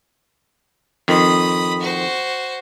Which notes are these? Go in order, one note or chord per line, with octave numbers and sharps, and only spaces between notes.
F2 D#3 B5 D#6
F#4 C5